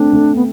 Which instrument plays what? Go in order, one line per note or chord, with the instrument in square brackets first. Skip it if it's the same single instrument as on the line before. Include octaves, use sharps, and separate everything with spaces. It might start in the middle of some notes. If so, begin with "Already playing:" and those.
Already playing: [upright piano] A3 C4 [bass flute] D4
[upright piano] A3
[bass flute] B3